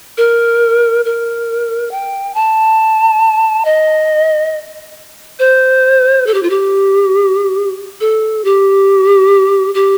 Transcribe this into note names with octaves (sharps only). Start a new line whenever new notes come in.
A#4
A#4
G5
A5
D#5
C5
A4
G4
F4
G4
A4
G4
G4